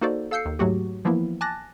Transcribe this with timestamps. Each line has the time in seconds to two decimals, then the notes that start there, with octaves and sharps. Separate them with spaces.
0.01 A#3 D#4 F#4 A4 C5 D5
0.31 A4 F5 E6 G6 C7 C#7
0.45 D#2
0.59 G#2 F#3 A3 F#4 G4
1.05 E3 F3 A#3 B3 E4
1.41 G#5 A5 D6 F#6 A6 A#6